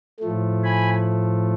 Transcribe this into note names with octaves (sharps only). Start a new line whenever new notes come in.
A2 F3 A3
G#5 B5